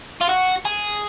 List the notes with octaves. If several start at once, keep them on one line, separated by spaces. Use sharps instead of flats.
F4
F#4
G#4